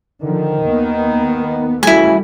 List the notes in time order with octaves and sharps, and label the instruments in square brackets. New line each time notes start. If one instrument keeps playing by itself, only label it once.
[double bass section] D3 F3 [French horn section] D#3
[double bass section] D#2 A#3 B3
[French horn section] C#3 E3 F#4 [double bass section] G3 A3 [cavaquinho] E4 G#5